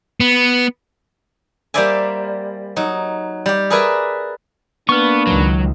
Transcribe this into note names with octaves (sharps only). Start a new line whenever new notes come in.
B3
G3 A#3 C5 D5 E5 G#5
F#3 D#4
G3 G4
G#4 A#4 B4 D5 E5 G#5
A#3 B3 D4 B4 C#6 F6
C#2 D#3 F#3